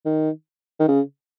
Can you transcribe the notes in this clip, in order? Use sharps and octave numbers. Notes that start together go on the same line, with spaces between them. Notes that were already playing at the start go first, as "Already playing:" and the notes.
D#3
D#3
C#3